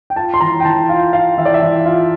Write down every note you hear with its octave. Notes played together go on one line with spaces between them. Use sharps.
G5
F4 A5
C6
E3 A#5
G5
E3 A5
F4 F5
F4 F5
E3 E5
D5
E5
E3
F4